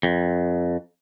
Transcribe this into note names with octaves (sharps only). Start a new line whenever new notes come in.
F2